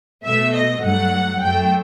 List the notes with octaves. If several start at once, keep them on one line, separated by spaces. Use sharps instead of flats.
B2 A3 E5
D#5
G2 F#3 A3 F#5
F#2 F#3 A3 G5